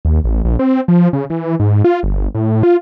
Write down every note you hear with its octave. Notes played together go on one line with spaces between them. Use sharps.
D#2
A1
A#1
C4
F3
C#3
E3
G#2
F4
G1
A2
F4